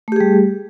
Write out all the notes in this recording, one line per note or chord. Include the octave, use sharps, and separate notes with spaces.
G3 A3 G4 G#4